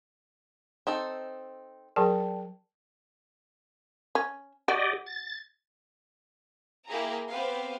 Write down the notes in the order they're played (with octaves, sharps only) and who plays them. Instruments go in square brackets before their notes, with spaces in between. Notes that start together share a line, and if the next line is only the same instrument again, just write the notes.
[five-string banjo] C4 D#4 A4
[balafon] F#3 G#4 A#4 [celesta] D5 G5 A5
[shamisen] C#4
[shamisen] F#4 [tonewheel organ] G4 D5 D#5
[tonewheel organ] A6
[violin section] A#3 E4 G4 G#4 A#5
B3 C4 G4 B4 C5 F5